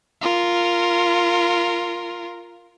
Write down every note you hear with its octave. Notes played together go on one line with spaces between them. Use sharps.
F4 A#4